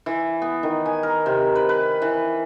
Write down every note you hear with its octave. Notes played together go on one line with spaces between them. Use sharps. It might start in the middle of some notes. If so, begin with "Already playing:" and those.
E3
B3
D#3
G#5
A#4
C3
B4
B4
E3